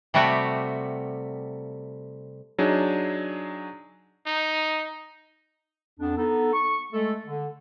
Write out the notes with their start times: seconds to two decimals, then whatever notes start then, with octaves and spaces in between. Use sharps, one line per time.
0.14 C3 G3 A3 F#4
2.58 F#3 D4 D#4 G#4
4.26 D#4
6.00 F2 B3 D4
6.17 B3 D#4 A4
6.53 C#6
6.92 G#3 A3 A4
7.26 D3